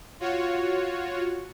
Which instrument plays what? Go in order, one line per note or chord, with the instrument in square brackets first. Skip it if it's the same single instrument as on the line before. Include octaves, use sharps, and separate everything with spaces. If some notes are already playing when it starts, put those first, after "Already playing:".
[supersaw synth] F4 F#4 C#5